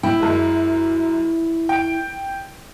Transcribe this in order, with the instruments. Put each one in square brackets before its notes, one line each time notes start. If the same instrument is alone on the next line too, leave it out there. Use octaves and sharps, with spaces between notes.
[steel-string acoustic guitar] E4 [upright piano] G5
[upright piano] F#2 G#3
G5 D7